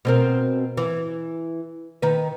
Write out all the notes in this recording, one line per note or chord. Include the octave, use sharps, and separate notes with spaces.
B2 C4 A#4
E3
D#3 B4